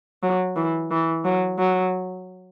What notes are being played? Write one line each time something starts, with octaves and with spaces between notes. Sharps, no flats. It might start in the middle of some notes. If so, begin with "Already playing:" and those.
F#3
E3
E3
F#3
F#3